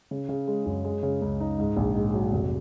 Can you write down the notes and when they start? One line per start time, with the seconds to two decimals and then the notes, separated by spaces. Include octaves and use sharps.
0.11 C#3
0.29 C#3
0.47 G#3
0.66 F#2
0.84 G#3
1.03 C#3
1.22 C#2
1.40 D#4
1.58 G#2
1.77 A#1
1.95 G#2
2.14 F#3
2.32 F1